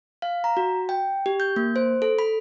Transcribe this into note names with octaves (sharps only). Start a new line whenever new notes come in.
F5
A#5
F#4
G5
G4
G6
A#3
C5
A4
B5